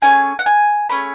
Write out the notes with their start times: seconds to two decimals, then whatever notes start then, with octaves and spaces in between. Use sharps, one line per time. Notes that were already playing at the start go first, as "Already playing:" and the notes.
0.02 A3 C#4 G#4 G#5
0.39 F#5
0.46 G#5
0.89 A3 C#4 G#4 B5